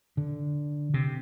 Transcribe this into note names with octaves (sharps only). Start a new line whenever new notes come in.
D3
C3